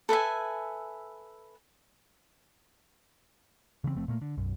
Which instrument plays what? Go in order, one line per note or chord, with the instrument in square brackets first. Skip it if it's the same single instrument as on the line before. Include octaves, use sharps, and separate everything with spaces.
[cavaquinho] A4 B4 E5 G#5
[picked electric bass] C#3 E3 G#3 C4
F1 F3 A3 C4
A#2 A3 A#3
D3
B1 F#2